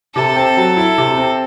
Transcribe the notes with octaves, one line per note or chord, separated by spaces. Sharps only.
C3 A4
C4
F#3
E4
C3
C4